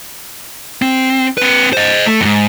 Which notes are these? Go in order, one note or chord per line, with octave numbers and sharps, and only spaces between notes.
C4
C4 B4
C5 D#5
A3
F2 G#2